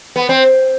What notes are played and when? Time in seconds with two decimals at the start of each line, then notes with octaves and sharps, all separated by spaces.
0.16 B3
0.29 C4